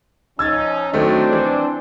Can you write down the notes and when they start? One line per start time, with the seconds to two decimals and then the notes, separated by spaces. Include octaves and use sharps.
0.39 F3 C#4 D#4 E6 G#6 A6
0.94 D#3 F#3 A3 C4 D4 C5
1.33 E3